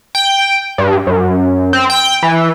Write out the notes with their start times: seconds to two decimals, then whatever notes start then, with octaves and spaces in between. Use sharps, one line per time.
0.15 G5
0.78 G2
1.07 F#2
1.73 C4
1.90 G5
2.23 E3